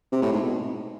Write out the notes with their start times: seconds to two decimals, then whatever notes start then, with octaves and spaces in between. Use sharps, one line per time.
0.12 C3
0.22 A2
0.32 G#2
0.42 B2